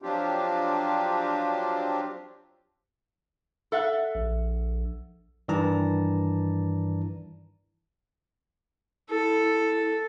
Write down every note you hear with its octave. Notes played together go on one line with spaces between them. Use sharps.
F3 F#3 C4 D4 F4 G4
A4 E5 F#5
A#1
G2 D#3 E3 D5 A5 A#5
E4 A4